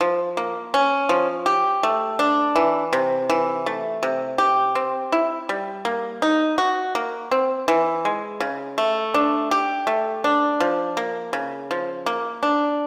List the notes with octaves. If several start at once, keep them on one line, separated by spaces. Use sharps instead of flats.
F3
A#3
C#4
F3
G4
A3
D4
E3
C3
E3
A3
C3
G4
C4
E4
G3
A#3
D#4
F#4
A#3
C4
E3
G#3
C#3
A3
D4
G4
A3
D4
F3
A#3
C#3
F3
A#3
D4